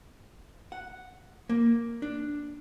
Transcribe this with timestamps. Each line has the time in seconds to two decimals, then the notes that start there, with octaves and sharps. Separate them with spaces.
0.72 F#5
1.49 A#3
2.02 D4